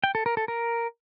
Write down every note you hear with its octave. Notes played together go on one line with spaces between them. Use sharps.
G5
A4
A#4
A4
A#4